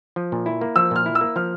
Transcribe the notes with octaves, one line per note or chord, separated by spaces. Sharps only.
F3
A#2
E4
A#3
F3 E6
A#2 F6
E4
E6
A#3
F3 F6